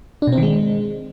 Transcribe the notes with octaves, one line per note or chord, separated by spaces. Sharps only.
D4
B2
C4
D#3
G#3